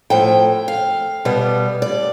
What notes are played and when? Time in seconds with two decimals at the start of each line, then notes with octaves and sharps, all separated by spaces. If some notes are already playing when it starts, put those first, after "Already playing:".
0.10 A2 F3 A3 G5
0.68 F5
1.25 B2 G3 B3
1.82 D5